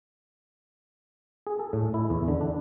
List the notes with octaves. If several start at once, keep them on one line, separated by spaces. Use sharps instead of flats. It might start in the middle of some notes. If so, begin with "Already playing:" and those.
G#4
A4
A2
E4
E2
D3
D4